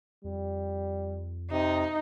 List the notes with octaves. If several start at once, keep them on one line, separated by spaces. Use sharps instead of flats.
F2 G3
C3 D#4